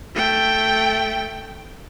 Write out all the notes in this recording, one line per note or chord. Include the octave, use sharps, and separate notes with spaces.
A3 G5